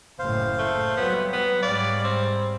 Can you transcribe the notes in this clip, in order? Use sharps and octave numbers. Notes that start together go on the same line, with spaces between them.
F#1 A2 C5 F5
A3
F#3 G3 B3
B3
G#2 G3 C#5 D5 F5 B5
C4